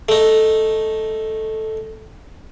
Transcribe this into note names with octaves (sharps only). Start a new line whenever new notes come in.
A3 D#4